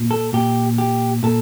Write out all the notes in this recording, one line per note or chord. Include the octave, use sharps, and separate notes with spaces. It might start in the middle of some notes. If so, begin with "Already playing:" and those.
Already playing: A#2
A4
A#2 G4
G4
A#2 A4